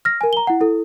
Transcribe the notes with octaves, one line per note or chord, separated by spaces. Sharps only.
F6 A#6
A#4 G#5
A#5 G7
E4 F#5
E4 A4